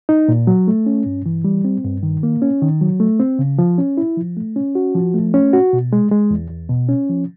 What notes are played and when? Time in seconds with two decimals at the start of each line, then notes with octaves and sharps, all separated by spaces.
0.09 D#4
0.28 A#2
0.47 F#3
0.68 A3
0.86 C#4
1.06 G2
1.26 E3
1.44 G3
1.65 C4
1.84 G2
2.03 D#3
2.23 A#3
2.42 C#4
2.62 D#3
2.81 F#3
3.00 A3
3.20 C4
3.39 C#3
3.59 F3
3.78 C#4
3.97 E4
4.17 F3
4.37 A3
4.56 C#4
4.75 F#4
4.95 F3
5.14 A3
5.34 C#4
5.53 F#4
5.73 B2
5.93 G#3
6.11 G#3
6.31 E2
6.50 E2
6.69 B2
6.89 C#4
7.09 F3